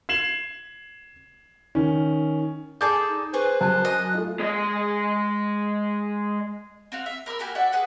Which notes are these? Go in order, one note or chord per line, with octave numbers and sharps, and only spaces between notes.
G#6 C7 E7 F#7
D#3 C#4
G#4 A4 D5 D#6 G6
D#4
G#4 B4 C5 C#6
F#2 G#5 A5 F#6
D#5
A3 F4
G#3 D#5
C4 F#4 F5
E5
A#4 B5 D6 E6
A#3 F#4 G4 G#5
F#4 D5 E5 F#5
G#4 B4 F#5